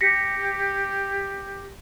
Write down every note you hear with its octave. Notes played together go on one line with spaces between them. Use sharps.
G4 A#6 B6 C#7